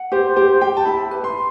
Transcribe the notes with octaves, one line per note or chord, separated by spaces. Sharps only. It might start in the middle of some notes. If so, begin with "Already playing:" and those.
Already playing: F#5
G4 C5
G4 C5
G4 G5
A5
E4 B5
B4
C6